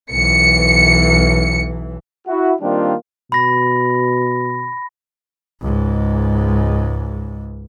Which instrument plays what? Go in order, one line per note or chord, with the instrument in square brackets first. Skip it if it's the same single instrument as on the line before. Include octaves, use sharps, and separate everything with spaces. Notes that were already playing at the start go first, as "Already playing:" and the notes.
[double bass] B1 E3 [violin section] C#7
[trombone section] E4 F#4
D#3 G3 A#3 C4 D4 F4
[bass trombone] B2 [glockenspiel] B5 A#6
[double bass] C#2 G#2